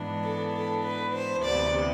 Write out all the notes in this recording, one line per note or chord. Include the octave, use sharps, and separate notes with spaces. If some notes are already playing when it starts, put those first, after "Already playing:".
Already playing: G#2 E3 B3 D4
A4
A4
B4
C5
D2 C3 E3 B3 D5